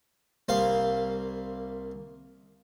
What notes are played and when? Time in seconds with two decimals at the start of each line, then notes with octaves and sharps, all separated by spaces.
0.49 C2 A#3 C5 F5